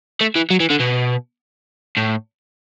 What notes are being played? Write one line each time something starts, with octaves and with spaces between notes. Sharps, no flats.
A3
E3
F#3
E3
D3
B2
A2